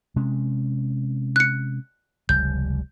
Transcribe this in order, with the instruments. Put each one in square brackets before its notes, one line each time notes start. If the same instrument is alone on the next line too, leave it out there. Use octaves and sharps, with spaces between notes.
[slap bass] C3 G#3 C#4
[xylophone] F#6 C#7
[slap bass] F1 C#2 G3 [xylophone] G6